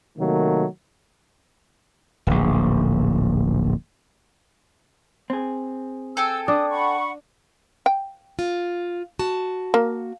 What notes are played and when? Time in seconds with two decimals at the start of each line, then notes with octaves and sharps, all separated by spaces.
0.18 C3 D#3 F#3 A3 A#3
2.27 D1 A#1
5.30 C4 G#4
6.17 A4 G5 G#5 E6
6.48 D4 D#6
6.71 F#5 B5 C#6
7.86 G5
8.39 F4
9.19 F#4 A5
9.74 A#3